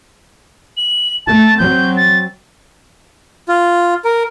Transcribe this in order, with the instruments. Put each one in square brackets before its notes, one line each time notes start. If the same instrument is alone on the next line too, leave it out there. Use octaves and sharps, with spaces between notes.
[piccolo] F#7
[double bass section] A3 [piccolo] A5
[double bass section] F#3 C4 [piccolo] G6
[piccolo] A6
[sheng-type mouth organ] F4
A#4